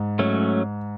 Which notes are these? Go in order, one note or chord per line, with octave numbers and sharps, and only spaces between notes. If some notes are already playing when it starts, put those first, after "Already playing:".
Already playing: G#2
F#3 A3 C#4